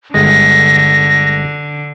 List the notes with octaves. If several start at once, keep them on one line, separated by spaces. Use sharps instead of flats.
G1 D3 G#3 A#6